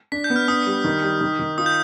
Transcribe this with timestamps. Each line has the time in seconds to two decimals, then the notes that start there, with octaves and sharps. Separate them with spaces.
0.12 D4 B6
0.24 G6
0.30 B3
0.36 F6
0.48 D4 D#6
0.67 G3
0.85 D#3
1.03 G3
1.21 D#3
1.39 D#3
1.58 F4 D#6
1.66 G6